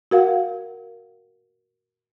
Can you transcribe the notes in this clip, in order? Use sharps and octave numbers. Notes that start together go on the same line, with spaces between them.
F#4 A#4 F5 F#5